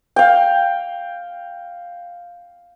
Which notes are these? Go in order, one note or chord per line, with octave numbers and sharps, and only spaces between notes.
F5 G5